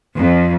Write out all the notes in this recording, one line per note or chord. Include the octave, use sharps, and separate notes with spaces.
F2